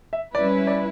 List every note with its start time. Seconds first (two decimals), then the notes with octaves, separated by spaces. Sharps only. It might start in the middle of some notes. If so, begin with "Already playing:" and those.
0.13 E5
0.35 G3 C#4 E4 B4 D5
0.67 D5